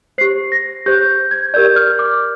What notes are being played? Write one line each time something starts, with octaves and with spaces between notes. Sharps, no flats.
G4 C5 C7
A#6
G4 C5 G6
G#6
G4 A#4 D5 G6
F6
D6